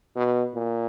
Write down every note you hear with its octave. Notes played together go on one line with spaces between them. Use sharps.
B2
A#2